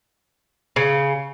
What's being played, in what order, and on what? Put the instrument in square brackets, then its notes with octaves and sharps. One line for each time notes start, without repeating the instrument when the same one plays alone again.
[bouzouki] C#3